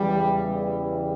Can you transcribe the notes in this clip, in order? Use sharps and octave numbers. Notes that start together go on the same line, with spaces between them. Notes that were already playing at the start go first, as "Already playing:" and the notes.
Already playing: E2 C#3 E3 G3
G3